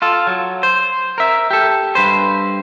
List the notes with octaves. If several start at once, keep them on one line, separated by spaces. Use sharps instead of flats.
F4 A4
F#3
C5
A#4 E5
G4 A4
G2 B4 C5